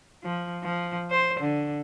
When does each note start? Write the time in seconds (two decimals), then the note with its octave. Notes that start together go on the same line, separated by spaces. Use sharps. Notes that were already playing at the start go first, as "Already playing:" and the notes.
0.23 F3
0.63 F3
1.10 C5
1.40 D3